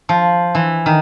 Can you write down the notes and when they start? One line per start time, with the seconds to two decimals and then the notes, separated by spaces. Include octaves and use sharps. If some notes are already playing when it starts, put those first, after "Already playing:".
0.09 F3
0.55 E3
0.86 D#3